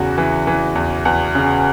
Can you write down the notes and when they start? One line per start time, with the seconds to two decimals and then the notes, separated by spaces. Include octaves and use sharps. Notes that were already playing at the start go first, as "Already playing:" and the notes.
Already playing: E2 C#3 F#4
0.18 E3
0.47 E3
0.75 E2
1.05 E2
1.35 C#3